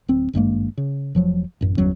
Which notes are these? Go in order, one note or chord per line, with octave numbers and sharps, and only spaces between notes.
D1 C4
G#1 G2 G#3 A#3
C#3
F1 F3 F#3
A1 F#2
G1 E2 F#3 C#4